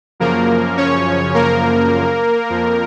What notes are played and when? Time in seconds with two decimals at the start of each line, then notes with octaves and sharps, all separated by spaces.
0.20 F#2 C#3 F3 A#3 A#4
0.77 C#4 C#5
1.34 A#3 A#4
2.50 F2 F3 A#3